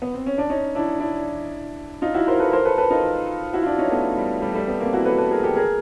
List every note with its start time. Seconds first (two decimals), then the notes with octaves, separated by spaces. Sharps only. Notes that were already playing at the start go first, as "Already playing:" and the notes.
0.02 B3
0.14 C4
0.27 C#4
0.38 D4
0.50 C#4 D#4
0.75 D4 E4
1.00 D4 E4
2.02 D#4 F4
2.14 E4 F#4
2.27 A#4 C5
2.40 A4 B4
2.52 A#4 C5
2.65 A4 B4
2.78 A4 B4
2.90 D#4 F4
3.53 E4 F#4
3.62 F4
3.66 D4 E4
3.78 C#4 D#4
3.91 A3 B3
4.17 G3
4.42 G3 A3
4.55 G3 A3
4.68 A3 B3
4.80 A#3 C4
4.93 E4 F#4
5.05 A4 B4
5.18 A4 B4
5.31 G#4 A#4
5.43 G4 A4
5.56 G#4 A#4